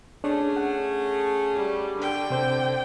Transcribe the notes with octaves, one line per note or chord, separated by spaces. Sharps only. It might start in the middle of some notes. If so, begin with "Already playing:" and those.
A3 C#4 D4 G#4 C#5
F#5
G3
D3 G5
C3 C5 G6